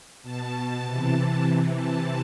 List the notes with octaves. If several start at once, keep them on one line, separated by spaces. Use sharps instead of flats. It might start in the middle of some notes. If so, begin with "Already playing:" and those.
B2 A5
C3 E3 A5
C3 E3
A5